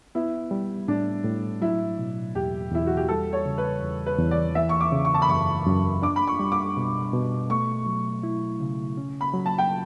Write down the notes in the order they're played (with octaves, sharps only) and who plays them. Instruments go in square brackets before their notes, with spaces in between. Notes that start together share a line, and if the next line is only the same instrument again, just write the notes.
[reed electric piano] B3 [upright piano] E4
[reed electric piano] G3
[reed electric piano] A2 [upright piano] D4
[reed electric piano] A2
[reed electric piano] F#3 [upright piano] E4
[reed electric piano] B2
[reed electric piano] E2 [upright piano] G4
[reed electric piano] E2 [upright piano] E4
[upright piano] F#4
G4
[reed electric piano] G3 [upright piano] A4
[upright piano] C#5
[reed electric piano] C#3
[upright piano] B4
[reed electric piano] E2
[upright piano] B4
[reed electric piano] E2
[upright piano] D5
[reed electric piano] E3 [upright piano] E5
[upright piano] C#6
D6
[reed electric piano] C#3
[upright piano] C#6
A5
B5
[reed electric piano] F#2 [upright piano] C#6
[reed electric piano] F#2
[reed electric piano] D4 [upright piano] D6
[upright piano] B5
C#6
[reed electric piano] G3
[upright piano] D6
[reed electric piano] B2
B2
[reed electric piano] A3 [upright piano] C#6
[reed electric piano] F#3
E4
C#3
C#4
[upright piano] B5
[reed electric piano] F#3
[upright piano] A5
G5